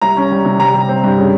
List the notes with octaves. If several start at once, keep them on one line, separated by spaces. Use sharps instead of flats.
C2 A#5
C#4
G3
C3
G3 A#5
G3
C4
G2
C#3